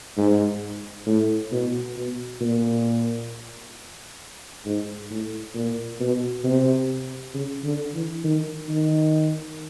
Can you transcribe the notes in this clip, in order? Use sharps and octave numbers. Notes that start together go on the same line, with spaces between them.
G#2
A2
B2
B2
A#2
G#2
A2
A#2
B2
C3
C#3
D3
E3
D#3
D#3